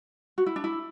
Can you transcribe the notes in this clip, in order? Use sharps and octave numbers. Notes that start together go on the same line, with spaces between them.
F#4
E4
D4
E4